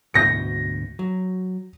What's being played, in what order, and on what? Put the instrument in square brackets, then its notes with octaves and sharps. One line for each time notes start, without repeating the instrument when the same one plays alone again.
[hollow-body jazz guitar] D2 G#2 B2 [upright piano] G6 A#6 C#7
[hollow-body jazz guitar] F#3